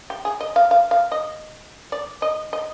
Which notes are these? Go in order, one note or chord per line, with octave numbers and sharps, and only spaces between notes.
G4
G#4
D#5
F5
F5
F5
D#5
D5
D#5
D#5